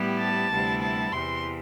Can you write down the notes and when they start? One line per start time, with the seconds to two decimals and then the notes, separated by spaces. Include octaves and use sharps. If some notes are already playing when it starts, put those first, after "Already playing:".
Already playing: A2 G3 B3 E4 G4
0.19 A5
0.51 D2 C3 G3 B3 E4
0.82 A5
1.12 E2 C3 E3 C6